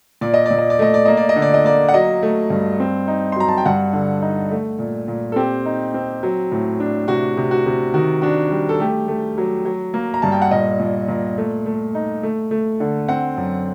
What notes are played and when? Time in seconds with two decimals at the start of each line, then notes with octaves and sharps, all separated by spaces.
0.21 A#2 D5
0.34 D#5
0.46 A#2 D5
0.58 D#5
0.70 D5
0.79 A3 D#5
0.94 D5
1.05 A#3 D#5
1.17 D5
1.29 D#5
1.36 D3
1.42 D5
1.54 D#5
1.65 A#3 D5
1.88 F#5
1.94 F#3 D#5
2.23 A3
2.50 G2
2.80 C4
3.08 D#4
3.32 C6
3.36 F#3 A#5
3.48 A5
3.58 G5
3.66 G2 F#5
3.93 D3
4.22 D#4
4.51 A3
4.79 A#2
5.08 A#2
5.32 A4
5.36 C4 G4
5.66 D#4
5.94 C4
6.23 F#3
6.52 A2
6.80 D4
7.08 C3 F#4
7.37 C3
7.51 F#4
7.66 C3
7.94 D#3 F#4
8.22 D4 F#4
8.51 G3
8.69 A4
8.80 A3 G4
9.08 A3
9.38 F#3
9.65 F#3
9.94 A#3
10.14 A#5
10.22 G2 A5
10.32 G5
10.42 F#5
10.51 A#2 D#5
10.80 A#2
11.08 A#2
11.38 A3
11.66 A3
11.95 D#4
12.23 A3
12.51 A3
12.80 D3
13.09 C4 F#5
13.38 F#2